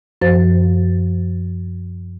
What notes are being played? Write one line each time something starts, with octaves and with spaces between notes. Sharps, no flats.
F#2 F3 C5 A6